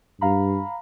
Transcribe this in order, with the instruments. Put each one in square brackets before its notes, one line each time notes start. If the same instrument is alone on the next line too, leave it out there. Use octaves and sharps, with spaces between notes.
[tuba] G2 [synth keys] F5 A#5 B5